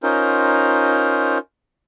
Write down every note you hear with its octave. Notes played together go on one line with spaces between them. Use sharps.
C#4 D#4 F4 A#4 C5